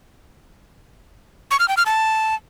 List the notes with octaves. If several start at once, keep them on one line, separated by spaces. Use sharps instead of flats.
C#6
F6
G5
F6
A5